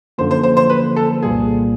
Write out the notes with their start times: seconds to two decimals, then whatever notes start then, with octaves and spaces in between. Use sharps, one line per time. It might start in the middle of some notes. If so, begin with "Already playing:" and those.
0.18 F#2 D3 F3 A#3 C5
0.31 C5
0.43 C5
0.57 C5
0.70 B4
0.96 A4
1.22 C2 A#2 G3 A#3 G#4